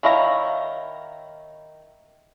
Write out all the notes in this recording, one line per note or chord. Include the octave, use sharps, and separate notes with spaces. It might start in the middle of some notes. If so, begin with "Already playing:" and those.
D#3 E4 C#5 F5 A#5